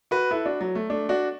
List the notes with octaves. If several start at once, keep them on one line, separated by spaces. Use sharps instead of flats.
F#4 B4
E4 A4
D4 F#4
F#3
A3
A3 D4
D4 F#4